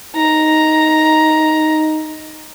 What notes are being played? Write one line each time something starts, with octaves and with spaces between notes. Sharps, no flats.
D#4 A#5